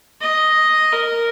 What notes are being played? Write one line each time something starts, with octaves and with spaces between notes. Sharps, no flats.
D#5
A#4